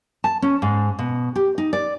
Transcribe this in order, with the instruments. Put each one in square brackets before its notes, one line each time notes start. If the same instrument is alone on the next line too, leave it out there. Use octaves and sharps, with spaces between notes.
[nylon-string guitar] A5
C#4
G#2
B2
G4
D#4
D5